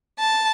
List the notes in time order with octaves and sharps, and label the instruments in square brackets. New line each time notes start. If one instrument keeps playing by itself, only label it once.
[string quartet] A5